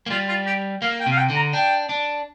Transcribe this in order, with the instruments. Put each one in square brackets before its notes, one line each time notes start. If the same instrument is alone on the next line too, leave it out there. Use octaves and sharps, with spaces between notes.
[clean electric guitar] A#3
[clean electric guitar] G3 [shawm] F4
[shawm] F4
G4
[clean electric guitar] A#3 [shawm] F5
[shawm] G5
[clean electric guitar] C3
[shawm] F5
G5
[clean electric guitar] D3
[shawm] A#5
[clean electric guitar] D4 [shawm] G5
[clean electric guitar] D4